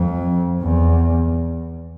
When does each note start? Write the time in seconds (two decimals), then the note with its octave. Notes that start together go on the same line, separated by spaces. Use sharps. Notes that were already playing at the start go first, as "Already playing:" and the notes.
Already playing: F2
0.62 E2